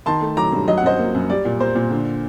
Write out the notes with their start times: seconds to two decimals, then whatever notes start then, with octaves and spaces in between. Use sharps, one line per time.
0.06 D#3 A5 C6
0.21 A3
0.37 F#3 A#5 D6
0.53 G2
0.68 F#3 D#5
0.77 F#5
0.83 F#2 C5 D#5
0.99 A#3
1.15 F#2
1.30 G3 D5
1.45 A#2
1.60 A#3 C5
1.75 A#2
1.91 D3